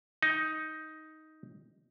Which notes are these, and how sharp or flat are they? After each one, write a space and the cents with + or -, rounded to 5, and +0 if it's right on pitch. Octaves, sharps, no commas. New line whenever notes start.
D#4 +10